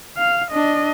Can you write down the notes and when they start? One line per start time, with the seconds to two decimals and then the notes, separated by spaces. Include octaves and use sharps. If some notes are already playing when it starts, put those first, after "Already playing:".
0.18 F5
0.51 D4 D#5